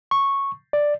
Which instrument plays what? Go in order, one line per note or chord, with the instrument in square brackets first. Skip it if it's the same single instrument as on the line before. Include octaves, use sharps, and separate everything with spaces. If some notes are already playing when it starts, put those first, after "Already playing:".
[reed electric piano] C#6
D5